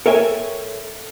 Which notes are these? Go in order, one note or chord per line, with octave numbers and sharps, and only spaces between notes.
A4 A#4 C#5 E5 G5 G#5